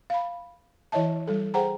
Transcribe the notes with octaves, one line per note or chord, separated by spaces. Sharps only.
F5 B5
E3 E4 C#5 D#5 E5 A5
G3 A4
G#4 C5 F#5 G5 A#5